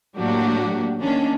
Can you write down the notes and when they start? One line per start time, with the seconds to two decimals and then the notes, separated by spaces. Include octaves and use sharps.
0.16 A2 F#3 A#3 D4 F#4 G4
1.00 D#3 A#3 C#4 D4